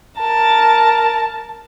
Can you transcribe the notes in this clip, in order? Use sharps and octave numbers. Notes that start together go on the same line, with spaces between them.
A#4 A5